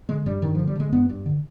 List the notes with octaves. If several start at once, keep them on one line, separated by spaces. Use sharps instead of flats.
D3 G#3
G2 G3
G2 D#3
D3 F3
G3
D3 G#3
G2 B3
G2
D3